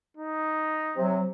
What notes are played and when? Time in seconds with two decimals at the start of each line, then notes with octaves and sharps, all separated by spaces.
0.17 D#4
0.97 C3 F#3